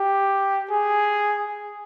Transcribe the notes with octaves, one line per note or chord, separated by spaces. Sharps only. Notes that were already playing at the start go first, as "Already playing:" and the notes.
Already playing: G4
G#4